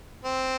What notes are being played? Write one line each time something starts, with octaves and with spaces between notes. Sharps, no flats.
C4